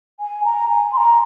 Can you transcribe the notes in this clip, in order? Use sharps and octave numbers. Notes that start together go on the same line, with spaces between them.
G#5
A#5
G#5
C6
A#5